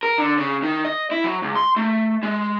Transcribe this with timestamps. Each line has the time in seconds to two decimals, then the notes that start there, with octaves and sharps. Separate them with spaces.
0.03 A#4
0.18 D3
0.38 C#3
0.63 D#3
0.85 D#5
1.11 E4
1.24 F#3
1.42 C#2
1.55 C6
1.76 A3
2.23 G#3